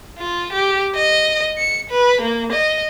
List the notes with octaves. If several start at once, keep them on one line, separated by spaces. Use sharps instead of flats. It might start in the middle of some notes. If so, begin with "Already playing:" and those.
F4
G4
D#5
C#7
B4
A#3
D#5